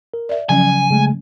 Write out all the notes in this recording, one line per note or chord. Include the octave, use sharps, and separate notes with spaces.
A#4
D5 E5
C#3 F3 F#3 C#4 G#5
C#3 G#3 A3